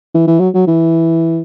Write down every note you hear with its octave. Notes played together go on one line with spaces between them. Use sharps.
E3
E3
F#3
F#3
E3